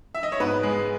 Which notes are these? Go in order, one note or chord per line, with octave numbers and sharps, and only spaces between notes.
E5
D#5
C#5
G#2 B3 B4
G#3